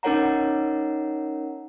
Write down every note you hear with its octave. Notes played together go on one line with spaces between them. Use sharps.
C#4 D#4 A#4 C#5 F#5 A#5